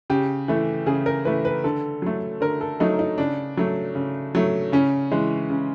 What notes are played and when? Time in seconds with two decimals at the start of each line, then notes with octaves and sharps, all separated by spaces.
0.10 C#3 G4
0.48 E3 A3
0.86 C#3 G#4
1.06 A#4
1.25 E3 A3 B4
1.45 B4
1.64 D3 A4
2.02 F#3 A3
2.41 D3 A#4
2.61 A4
2.80 F#3 A3 D#4
2.99 D#4
3.18 C#3 D4
3.57 F#3 A3
3.95 C#3
4.35 F#3 A3
4.72 C#3 C#4
5.12 E3 G#3
5.50 C#3